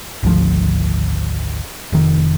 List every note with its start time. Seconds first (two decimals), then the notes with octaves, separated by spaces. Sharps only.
0.23 G#1 D2 F3
1.93 F1 D#3